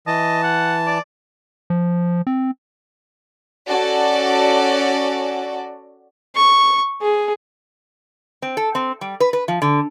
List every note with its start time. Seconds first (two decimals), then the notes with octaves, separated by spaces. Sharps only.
0.07 E3 D#5 A5
0.43 F#5
0.86 D5
1.70 F3
2.27 C4
3.68 C#4 F#4 A4 D5
6.36 C#6
7.02 G#4
8.42 C4
8.57 A4
8.75 C4
9.01 G3
9.20 B4
9.33 B4
9.48 F3
9.62 D3